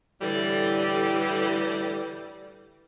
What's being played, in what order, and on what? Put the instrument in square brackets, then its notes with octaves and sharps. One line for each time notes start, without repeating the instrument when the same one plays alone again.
[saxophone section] A2 D3 E3 G3